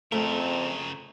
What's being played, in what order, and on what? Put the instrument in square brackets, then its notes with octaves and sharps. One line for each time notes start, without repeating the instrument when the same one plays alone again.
[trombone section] F2 C4 [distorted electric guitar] C#3 A#4 [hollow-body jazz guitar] A3